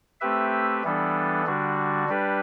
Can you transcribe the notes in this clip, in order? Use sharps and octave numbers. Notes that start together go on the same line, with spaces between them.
A3 C4 G4 B4 E5
E3 G3 B3 D4 A4
D3 G3 D4 F#4
G3 D4 G4 B4